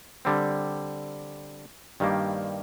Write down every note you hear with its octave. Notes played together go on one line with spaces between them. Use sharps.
D3 G3 C4
G2 D#3 G3 A#3